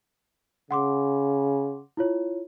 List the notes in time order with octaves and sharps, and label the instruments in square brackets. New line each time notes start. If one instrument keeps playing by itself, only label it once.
[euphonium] C#3 [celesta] F#5 C6 D6
[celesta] E4 F4 C#5